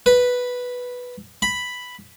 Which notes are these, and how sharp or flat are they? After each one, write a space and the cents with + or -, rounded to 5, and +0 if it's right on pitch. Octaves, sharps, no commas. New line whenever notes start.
B4 -5
B5 +0